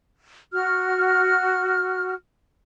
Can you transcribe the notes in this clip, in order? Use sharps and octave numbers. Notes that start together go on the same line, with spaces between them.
F#4 F6